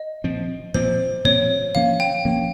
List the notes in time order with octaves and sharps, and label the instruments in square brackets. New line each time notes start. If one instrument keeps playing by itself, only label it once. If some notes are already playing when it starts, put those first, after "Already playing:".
Already playing: [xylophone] D#5
[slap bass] A#2 F3 C4
[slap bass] A#2 F3 C4 [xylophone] C5
[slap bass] A#2 F3 C4 [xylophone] C#5
[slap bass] F3 A#3 C#4 [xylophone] F5
[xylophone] G5
[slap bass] F3 A#3 C#4